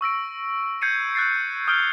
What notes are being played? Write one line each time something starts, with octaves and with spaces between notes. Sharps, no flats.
C#6 E6 A#6 D7
G6 G#6 C7 C#7 D#7
F#6 A6 C7
D#6 F6 G6 D7 G7